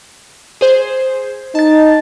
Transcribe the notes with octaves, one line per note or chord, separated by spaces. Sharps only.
G#4 C5
D#4 A5 A6